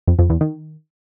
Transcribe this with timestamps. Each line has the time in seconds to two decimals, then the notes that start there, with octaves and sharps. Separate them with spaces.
0.08 F2
0.19 F2
0.30 E2
0.41 D#3